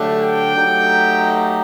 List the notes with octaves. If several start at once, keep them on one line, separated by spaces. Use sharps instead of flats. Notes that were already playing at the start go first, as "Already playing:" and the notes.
Already playing: D3 F#3 A3 D4 G4
G5
F#3 A3 D#4 G4